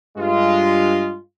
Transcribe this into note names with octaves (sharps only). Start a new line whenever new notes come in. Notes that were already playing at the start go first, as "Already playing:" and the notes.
G2 G#3 F4